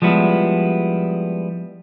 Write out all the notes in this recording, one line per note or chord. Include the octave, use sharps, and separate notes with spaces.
F3 G3 G#3 B3 E4